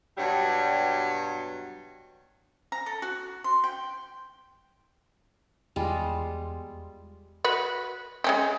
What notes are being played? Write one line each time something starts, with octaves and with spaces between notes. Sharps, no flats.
G2 B2 F#3 G3
A#5
A4
F#4
C6
G5
E2 G3 G#3 F4
F#4 B4
G#3 C#4 G4